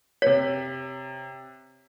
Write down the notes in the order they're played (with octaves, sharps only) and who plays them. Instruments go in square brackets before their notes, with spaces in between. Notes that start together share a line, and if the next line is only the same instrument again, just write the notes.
[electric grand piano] C3 B6 [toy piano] C#5